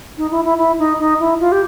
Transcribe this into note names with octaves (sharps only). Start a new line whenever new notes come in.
D#4
E4
E4
E4
D#4
D#4
E4
F4
G4